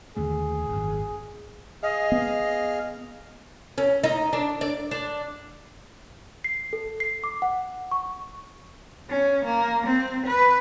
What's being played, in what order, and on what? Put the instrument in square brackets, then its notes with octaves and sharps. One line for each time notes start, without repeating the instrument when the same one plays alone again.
[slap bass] D#2 D3 A3 [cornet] G#4
[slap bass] G#1 F#2
[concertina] G#4 F5 [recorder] D#5
[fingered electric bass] B3
[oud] C#4
D#4
D4
D5
D4
[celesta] C7
A4
C7
D6
F#5
C#6
[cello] C#4
A#3
C4
B4